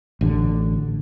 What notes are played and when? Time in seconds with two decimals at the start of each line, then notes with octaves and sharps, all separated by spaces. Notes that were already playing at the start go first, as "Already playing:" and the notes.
0.21 A1 D3